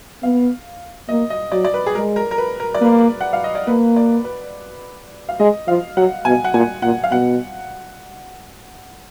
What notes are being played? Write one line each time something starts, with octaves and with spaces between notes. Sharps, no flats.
B3 F5
A#3 D#5
D#5
F#3 D5
D5
B4
G#4
G#3 A#4
A#4
A#4
B4
A#4
D5
A#3 B4
F#5
F5
D#5
D5
A#3 B4
D5
B4
F5
G#3 D#5
F3 F5
F#3 F#5
B2 G#5
F#5
A#2 G#5
A#2 F#5
F5
B2 F#5